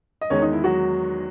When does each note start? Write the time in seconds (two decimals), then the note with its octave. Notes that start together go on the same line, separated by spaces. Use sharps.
0.21 D#5
0.30 E2 D#3 G#3 C#4 C#5
0.42 D#4
0.53 E4
0.64 F#3 F#4